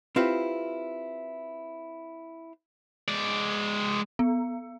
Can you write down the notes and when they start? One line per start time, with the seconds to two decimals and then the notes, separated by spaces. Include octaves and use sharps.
0.16 C4 E4 F4 G4 B4
3.08 G#3 D5
4.19 B3